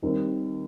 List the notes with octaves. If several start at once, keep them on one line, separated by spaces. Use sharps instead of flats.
D#2 D#3 G3 C4